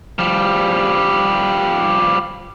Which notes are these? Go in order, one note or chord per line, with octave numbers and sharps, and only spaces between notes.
F3 G3